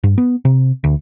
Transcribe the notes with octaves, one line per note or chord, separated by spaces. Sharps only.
G2
B3
C3
D2